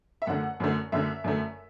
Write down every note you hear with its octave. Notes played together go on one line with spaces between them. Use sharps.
E5
F#2 D3 A3 F#5
F#2 D3 A3
F#2 D3 A3 E5
F#2 D3 A3